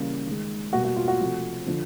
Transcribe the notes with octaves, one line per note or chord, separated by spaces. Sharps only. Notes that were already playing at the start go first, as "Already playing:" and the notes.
Already playing: C#3 E3 G3 A#3
D#3 G#3
B2 G3 A#3 F#4
F#4
F4
F#4
C3 F3 A3
D3 F3